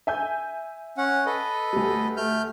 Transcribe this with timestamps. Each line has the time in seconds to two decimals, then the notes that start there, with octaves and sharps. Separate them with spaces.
0.07 E5 G#5 G6
0.97 C#4 F#5
1.26 A4 B4 D#5
1.73 D2 G3
2.17 A3 F6 G6